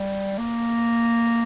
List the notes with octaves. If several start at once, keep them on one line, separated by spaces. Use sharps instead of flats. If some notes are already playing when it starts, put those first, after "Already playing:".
Already playing: G3
A#3